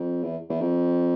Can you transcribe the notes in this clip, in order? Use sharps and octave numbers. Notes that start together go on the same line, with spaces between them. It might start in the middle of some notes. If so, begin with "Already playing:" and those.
Already playing: F2
E2
E2
F2